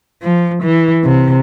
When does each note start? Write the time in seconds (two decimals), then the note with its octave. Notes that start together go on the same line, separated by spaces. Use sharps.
0.23 F3
0.64 E3
1.04 C3